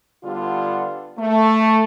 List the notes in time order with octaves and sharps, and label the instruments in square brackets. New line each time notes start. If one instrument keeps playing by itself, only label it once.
[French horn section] D3 G3 B3 F4
A3